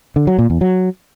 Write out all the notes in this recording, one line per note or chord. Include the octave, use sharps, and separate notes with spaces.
D3
F#3
A#2
E2
F#3